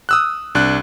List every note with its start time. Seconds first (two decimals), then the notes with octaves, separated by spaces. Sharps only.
0.09 D#6 E6 F#6
0.55 C2 D4 F#6